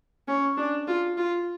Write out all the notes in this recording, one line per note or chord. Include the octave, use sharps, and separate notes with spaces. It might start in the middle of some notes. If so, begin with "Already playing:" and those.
C#4
D4
F4
F4